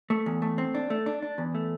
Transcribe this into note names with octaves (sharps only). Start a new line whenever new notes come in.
A3
E2
A3
C4
D4
A3
D4
D4
E2
A3